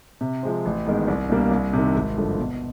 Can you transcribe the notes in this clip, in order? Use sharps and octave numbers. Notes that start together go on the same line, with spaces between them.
C3
F3 G#3 C4
A1
G#2 D#3 G#3 B3
C2
B2 G3 A#3 D4
C2
C3 D#3
G#1
G2 D3 F3
B2